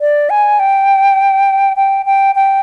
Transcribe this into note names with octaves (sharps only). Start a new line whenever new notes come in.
D5
G#5
G5
G5
G5
G5